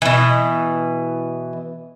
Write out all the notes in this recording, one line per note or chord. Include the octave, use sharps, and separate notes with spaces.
B2 E3